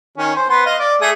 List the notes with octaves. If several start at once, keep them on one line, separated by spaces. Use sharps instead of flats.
D#3 C#4
C5
B3 C6
D#5 F5
D5
A3 G#4 D#6